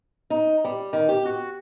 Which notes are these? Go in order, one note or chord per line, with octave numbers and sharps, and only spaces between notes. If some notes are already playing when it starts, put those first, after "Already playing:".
D#4
G3
D#3
G4
F#4